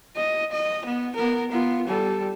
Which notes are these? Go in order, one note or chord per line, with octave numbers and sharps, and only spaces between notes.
D#5
D#5
B3
B3 A#4
B3 F4
G3 A4